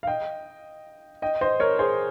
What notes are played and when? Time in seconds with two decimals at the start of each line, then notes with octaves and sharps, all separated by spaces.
0.03 F5
0.07 D#5 G5
1.22 D#5 G5
1.41 C5 D#5
1.60 A#4 C#5
1.79 G#4 C5